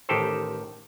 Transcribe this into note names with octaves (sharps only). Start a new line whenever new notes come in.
A1 D#3 G4 A4 C5